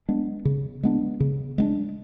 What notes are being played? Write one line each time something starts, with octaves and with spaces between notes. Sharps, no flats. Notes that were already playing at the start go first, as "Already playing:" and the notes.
G#3 B3 D4
C#3
G#3 B3 D4
C#3
G#3 B3 D4